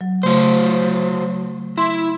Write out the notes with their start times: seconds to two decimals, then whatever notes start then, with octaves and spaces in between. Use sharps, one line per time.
0.01 F#3
0.23 C#3 F#3 A3 C5
1.78 E4 C6